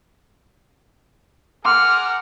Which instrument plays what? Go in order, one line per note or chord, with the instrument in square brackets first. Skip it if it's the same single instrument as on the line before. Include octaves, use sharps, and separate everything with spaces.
[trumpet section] G#4 A#4 F#5 [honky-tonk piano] C6 D6 D#6 [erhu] F6